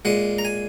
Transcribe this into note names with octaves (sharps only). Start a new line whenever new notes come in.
A#2 G#3 F#5
A#5
G#5